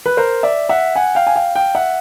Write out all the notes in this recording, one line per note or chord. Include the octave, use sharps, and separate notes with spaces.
B4
A#4 C5
D5 E5
E5 F#5
F#5 G#5
F5 G5
G#5
F5 G5
F5 G5
E5 F#5